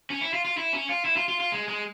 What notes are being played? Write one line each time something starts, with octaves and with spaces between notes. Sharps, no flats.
C#4
E4
F4
F4
E4
C#4
F4
E4
F4
F4
F4
G#3
G#3